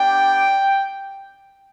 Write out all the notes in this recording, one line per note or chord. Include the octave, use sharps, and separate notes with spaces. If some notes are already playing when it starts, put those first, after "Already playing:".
Already playing: B3 D4 G4 G5